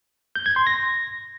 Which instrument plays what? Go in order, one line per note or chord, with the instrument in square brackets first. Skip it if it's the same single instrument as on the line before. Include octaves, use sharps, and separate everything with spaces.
[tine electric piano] G6
G#6
C6
A#6